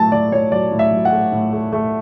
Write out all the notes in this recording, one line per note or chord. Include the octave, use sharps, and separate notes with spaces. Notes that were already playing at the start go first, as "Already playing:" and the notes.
Already playing: A2 F#3 A5
A2 D5
A2 C#5
F#3 D5
A2
E5
F#3
F#5
A3
A2
A3
A3